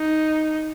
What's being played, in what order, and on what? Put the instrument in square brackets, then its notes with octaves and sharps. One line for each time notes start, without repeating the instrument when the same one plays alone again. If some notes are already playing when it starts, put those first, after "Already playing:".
Already playing: [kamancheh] D#4